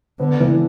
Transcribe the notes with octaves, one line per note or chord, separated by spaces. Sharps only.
D3 B3
E3